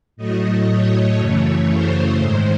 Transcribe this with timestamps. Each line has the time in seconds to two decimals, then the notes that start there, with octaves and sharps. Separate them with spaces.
0.17 A2 F#3 A3 D#5
0.68 C#5
1.18 F#2 C#3 E3 A3
1.70 C5
2.20 G#2 D#3 G#3